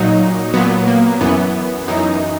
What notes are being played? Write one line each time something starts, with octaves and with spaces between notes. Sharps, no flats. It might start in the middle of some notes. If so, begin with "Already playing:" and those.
Already playing: A#2 F#3 D#4
A#2 F#3 B3
A#3
F#2 E3 B3
F#2 E3 D#4